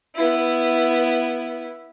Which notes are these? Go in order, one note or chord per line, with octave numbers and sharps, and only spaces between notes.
B3 E4